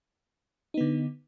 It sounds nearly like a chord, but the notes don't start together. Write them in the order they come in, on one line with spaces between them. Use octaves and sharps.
D#4 B3 D3